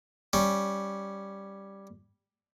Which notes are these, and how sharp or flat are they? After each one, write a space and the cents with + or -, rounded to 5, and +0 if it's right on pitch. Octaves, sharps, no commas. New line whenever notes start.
G3 +0 C#4 +0